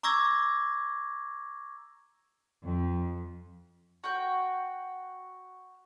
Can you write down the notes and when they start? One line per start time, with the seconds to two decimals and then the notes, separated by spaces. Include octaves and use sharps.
0.03 A#5 C#6 D6 E6 G#6 A#6
2.62 F2
4.04 F#4 G5